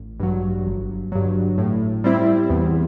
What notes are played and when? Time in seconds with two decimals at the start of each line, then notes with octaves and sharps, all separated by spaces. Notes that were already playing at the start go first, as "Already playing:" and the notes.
Already playing: A1
0.20 G2 F#3
0.66 G1
1.12 G2 F#3
1.58 A2
2.04 G3 C4 E4
2.50 E2